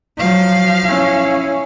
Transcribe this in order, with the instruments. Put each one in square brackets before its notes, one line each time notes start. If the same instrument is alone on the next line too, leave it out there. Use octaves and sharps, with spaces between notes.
[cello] F3 F5 [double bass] F#3
[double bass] C#4 E4